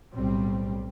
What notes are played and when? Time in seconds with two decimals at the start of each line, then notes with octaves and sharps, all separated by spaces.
0.14 B1 A2 G3 C4